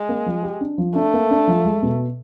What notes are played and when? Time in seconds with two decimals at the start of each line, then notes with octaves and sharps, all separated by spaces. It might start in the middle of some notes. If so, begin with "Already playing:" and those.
Already playing: G#3
0.09 A#3
0.26 F3
0.43 G4
0.61 D4
0.78 F3
0.95 A3 D4
1.14 A#3
1.31 D4
1.48 F3
1.65 G#3
1.82 B2